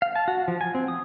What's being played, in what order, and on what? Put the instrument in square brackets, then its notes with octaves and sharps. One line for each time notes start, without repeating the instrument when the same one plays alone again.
[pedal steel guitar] F5
A5
F#4
F3
G#5
C4
D#6